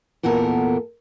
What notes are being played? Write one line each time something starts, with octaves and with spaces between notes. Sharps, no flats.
E2 A#2 B3 A4 A#4